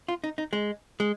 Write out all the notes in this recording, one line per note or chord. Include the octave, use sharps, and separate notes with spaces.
F4
D#4
D#4
G#3
G#3